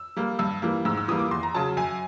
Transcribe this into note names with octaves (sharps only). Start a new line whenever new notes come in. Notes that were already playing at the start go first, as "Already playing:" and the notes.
Already playing: E6
G3 A#3
G2 E6
E3 G3 A#3
G#2 E6
E6
E3 G3 A#3 D#6
D6
E2 C6
A#5
C#3 F#3 A5
F#2 G#5